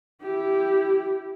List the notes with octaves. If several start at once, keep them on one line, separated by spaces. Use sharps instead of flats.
E4 G4